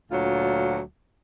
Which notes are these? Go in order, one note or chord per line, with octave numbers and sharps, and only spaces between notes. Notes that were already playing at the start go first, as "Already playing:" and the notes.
D2 A#2 F#3 F4